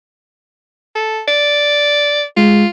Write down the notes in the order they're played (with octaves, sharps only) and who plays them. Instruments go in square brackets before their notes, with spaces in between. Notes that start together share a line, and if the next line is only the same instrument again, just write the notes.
[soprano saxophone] A4
D5
[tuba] G#3 [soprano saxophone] F4